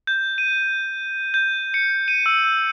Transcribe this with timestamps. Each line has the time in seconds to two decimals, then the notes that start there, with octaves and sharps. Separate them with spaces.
0.07 G6
0.38 D#7
1.34 G6
1.74 C#7
2.08 D#7
2.26 E6
2.45 E6